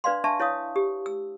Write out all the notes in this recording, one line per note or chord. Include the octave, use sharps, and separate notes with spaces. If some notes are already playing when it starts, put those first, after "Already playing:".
D4 B4 D5 F5 C6
D4 E5 A5 C#6
E4 C#5 F5 D#6
G4
E6